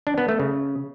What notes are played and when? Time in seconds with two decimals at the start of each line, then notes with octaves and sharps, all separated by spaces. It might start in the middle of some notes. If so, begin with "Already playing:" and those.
0.07 D4
0.18 B3
0.29 A3
0.40 C#3